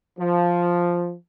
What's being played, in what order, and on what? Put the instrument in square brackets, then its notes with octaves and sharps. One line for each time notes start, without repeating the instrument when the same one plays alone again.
[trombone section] F3